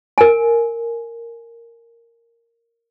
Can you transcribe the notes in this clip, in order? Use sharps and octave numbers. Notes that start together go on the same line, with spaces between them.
A#4 G#5